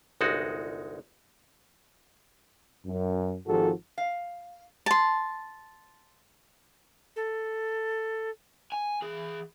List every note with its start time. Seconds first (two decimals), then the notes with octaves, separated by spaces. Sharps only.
0.21 G1 C2 G#3 D#4 F#4
2.86 F#2
3.47 G#1 G#2 F3 F#4 G4 A4
3.98 F5
4.86 A5 C6
7.16 A4
8.72 G#5
9.02 E3 G#4